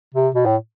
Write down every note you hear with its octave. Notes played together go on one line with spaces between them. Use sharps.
C3
B2
A2